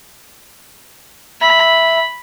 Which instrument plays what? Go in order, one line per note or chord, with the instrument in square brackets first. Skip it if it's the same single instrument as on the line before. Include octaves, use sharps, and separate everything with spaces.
[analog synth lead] E5 [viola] B5